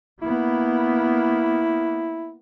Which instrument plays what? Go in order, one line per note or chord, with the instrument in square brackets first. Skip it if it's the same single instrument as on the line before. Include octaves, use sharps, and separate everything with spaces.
[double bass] A#3 B3 [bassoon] E4